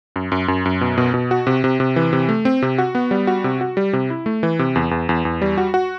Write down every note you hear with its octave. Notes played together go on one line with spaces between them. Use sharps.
F#2
F#2
F#2
F#2
B2
B2
B2
F#4
C3
C3
C3
E3
C3
A3
C4
C3
F#4
B3
G3
F#4
C3
F#4
G3
C3
E4
A3
E3
C3
E2
E2
E2
E2
G3
F#4
F#4